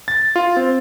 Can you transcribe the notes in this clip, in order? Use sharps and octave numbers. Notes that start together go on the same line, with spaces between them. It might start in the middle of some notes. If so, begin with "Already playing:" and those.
A6
F4
C4